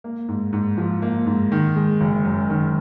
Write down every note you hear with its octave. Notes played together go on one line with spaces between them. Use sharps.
A#3
G#2
G#2
F3
A#3
G#2
D#3
G#3
F#1
F#2
D#3